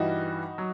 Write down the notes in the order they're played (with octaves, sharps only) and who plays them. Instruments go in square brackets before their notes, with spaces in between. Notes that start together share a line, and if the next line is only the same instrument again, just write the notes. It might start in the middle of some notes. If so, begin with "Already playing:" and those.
Already playing: [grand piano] G2 E3 G3 D#4 F#4
F#3